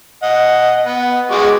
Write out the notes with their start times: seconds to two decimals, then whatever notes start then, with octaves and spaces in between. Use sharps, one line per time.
0.23 D#5 F#5
0.85 B3
1.31 G#3 F#4 D6